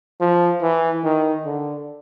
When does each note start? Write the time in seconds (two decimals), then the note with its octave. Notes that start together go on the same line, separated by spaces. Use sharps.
0.21 F3
0.62 E3
1.04 D#3
1.45 D3